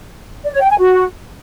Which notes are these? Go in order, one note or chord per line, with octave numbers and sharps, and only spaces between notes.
D5
C#5
G5
G#5
F#4